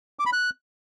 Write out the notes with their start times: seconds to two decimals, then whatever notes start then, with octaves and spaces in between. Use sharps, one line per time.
0.19 D6
0.26 B5
0.33 F#6